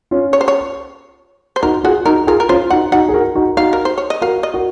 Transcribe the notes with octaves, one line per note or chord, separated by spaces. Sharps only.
C#4 F4
C#5
C5
C#5
C5
D#4 F#4 A#4
F4 F#4 G#4
D#4 F#4 A#4
F4 G#4 A#4
A#4
C#4 F4 C5
D#4 F#4 F#5
D#4 F#4 F#5
G#4
F#4 A#4
D#4 F#4
D#4 F#4 F5
A#4
C5
C#5
D#5
F#4 A#4 F5
D#5
F#4 A#4